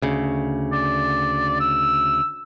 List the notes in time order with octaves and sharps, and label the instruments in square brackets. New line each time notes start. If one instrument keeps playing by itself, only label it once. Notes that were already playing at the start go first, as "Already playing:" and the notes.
[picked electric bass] D2 C#3
[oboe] D5
E6